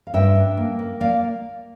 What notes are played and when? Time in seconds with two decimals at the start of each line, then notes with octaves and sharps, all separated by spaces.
0.07 F5
0.14 G2 E5 G5
0.35 D4
0.57 A#3
0.79 A#3
1.00 A#3 D5 F5